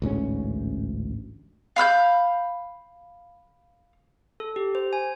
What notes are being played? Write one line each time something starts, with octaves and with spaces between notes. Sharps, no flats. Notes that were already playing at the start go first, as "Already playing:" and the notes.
A1 D2 G#2 C#4
F5 B5 F6 G6
A4
G4
C5
G#5